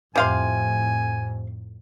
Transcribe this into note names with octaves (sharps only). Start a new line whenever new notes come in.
F2 A2 C3 F5 G#5 C6